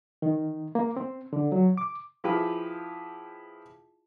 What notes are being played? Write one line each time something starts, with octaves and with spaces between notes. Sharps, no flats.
D#3
A#3
C4
D3
F#3
D6
F3 E4 F4 G4 G#4 B4